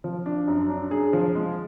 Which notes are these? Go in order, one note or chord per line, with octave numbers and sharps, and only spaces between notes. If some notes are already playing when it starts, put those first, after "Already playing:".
F3
D4
F#2
D4
G#4
F3
G#3